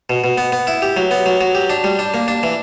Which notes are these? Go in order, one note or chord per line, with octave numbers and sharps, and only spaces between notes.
B2
B2
B3
B3
E4
G4
F#3
B3
F#3
F#3
G4
D4
G3
D4
A#3
D4
E3